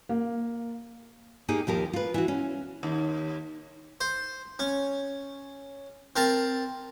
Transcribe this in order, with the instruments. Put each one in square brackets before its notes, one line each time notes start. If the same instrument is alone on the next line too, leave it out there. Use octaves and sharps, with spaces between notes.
[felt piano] A#3
[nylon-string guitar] A#3 D#4 G4 G#4
D#2 F3 G4 A#4
F4 B4
E3 F#4
C#4
[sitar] D#2
[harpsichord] C5
C#4
C4 A#4 A5